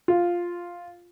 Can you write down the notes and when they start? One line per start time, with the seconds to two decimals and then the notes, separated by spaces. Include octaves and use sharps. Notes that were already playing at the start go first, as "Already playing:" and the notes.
0.08 F4